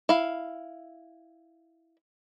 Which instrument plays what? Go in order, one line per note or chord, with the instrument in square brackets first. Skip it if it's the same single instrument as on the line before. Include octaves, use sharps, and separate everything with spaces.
[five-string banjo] E4 F5